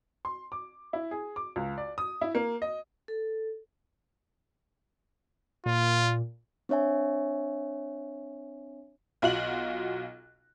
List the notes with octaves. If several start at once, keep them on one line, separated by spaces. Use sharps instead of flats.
C6
D6
E4
G#4
D6
C#2
D5
D#6
E4
A#3
D#5
A4
A#2 F4
C4 D4 C#5 E5 G#5
B1 F4 F#4 F#6 F#7